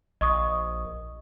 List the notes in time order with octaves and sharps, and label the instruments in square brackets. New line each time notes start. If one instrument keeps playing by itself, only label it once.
[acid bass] A#1 [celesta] D#5 C#6 D#6